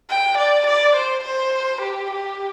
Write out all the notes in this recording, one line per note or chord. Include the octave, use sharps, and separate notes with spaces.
G5
D5
D5
C5
C5
G4
G4